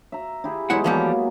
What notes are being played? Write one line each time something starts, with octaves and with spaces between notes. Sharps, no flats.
E5 A#5
E4 G4 G#4
E2 F#3 G#3 B3 E4 F#5
E3 F3 G3 A#3 B3 E5